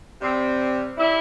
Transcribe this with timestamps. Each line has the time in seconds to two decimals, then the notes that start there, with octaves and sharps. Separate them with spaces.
0.21 C3 G3 C4
0.98 G3 E4